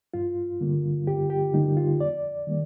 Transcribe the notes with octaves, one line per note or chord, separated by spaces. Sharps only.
G2 F4
D3 G3 A#3
G2 G4
G4
D3 G3 A#3 D#4
F4
F2 D5
D#3 G3 A#3